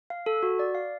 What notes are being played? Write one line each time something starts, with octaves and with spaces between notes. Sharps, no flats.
F5
A4
F#4
D5
F5